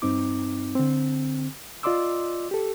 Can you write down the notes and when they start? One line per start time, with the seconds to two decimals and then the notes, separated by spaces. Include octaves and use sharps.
0.02 G2 C4 D#4 D6
0.75 D3 C4
1.83 F4 D5 D#5 C6 D6 E6
2.51 G4 A4